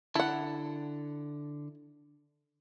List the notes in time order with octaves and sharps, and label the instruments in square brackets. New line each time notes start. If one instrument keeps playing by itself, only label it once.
[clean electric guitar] D3 A5 [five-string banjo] E4 F#5